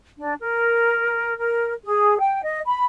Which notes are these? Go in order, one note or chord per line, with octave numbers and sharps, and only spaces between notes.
D4
A#4
A#4
G#4
G5
D#5
B5